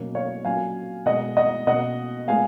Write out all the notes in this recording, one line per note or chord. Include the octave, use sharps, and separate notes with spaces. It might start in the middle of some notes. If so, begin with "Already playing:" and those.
Already playing: B2 F#3 A#3 C#4
C#5 F5
A#2 F#3 C#4 F5 G#5
B2 G#3 B3 D#5 F#5
D#5 F#5
B2 A#3 C#4 D#5 F#5
A#2 G#3 B3 F5 G#5